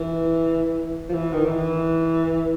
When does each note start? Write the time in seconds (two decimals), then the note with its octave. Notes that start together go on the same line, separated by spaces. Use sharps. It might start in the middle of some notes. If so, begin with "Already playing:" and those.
Already playing: E3
1.09 F3
1.13 E3
1.33 D#3
1.45 E3